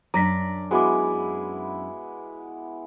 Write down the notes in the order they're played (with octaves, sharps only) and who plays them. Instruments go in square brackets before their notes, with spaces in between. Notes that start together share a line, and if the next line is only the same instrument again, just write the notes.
[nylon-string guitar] F#2 D4 [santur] D5 [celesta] A#5 A#6 B6
[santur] G#3 B3 E4 [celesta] F#4 D6